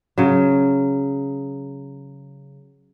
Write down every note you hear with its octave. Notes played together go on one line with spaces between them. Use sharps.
C#3 F#3